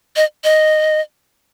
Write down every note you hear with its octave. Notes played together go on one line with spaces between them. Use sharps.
D#5
D#5